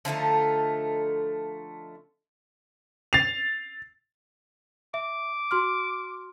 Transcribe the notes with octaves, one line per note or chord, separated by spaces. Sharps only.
D3 F3 A3 D#4
A6 C7 F7
E5 D6
F#4 C6 F6